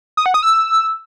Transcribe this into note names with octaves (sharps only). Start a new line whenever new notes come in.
D#6
F#5
D#6
E6